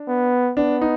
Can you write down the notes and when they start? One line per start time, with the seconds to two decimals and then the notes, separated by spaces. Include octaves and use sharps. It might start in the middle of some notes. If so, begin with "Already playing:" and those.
Already playing: D4
0.08 B3
0.57 B3 D4
0.81 D#4